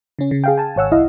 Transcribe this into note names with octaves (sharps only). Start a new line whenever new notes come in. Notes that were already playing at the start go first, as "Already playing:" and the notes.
C#3 C#4
C#3
G#4 F5 G5
G#5 A5
G#1 C#5 F#5 E6
C2 E4 D#5 F5